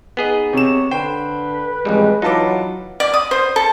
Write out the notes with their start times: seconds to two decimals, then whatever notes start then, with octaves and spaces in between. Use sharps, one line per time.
0.17 B3 D#4 G#4 D#5
0.53 C3 C#5 E7
0.91 D3 B4 C5 G5
1.85 A1 F2 G3 G#3
2.22 E3 F#3 D#4 F4 A5 D6
3.00 D5
3.14 D#6
3.31 C5
3.56 A4